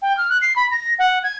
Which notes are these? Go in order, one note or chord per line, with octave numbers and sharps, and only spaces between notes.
G5
F6
F#6
C7
B5
A#6
F#5
G#6